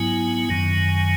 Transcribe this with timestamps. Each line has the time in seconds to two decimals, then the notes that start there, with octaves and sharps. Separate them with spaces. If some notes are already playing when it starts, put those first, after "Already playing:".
Already playing: G#2 F#3 B3 E4 G#5
0.49 F#2 D#3 F#3